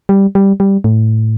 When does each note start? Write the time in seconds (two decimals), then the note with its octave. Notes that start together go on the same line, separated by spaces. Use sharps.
0.09 G3
0.35 G3
0.60 G3
0.84 A2